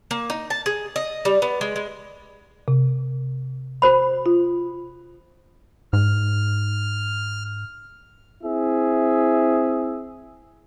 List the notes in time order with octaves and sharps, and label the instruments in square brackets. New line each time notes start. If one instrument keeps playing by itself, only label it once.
[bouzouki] A#3
D#4
A5
G#4
D#5
G3
B3
G#3
G#3
[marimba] C3
[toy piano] F#4 C5 B5
[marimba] F4
[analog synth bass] G#2 [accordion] F6
[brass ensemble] C4 E4 G#4 E5